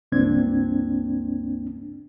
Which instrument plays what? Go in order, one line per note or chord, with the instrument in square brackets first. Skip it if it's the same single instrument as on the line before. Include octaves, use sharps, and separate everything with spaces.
[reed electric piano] C#2 G2 A#3 C4 D4 G#6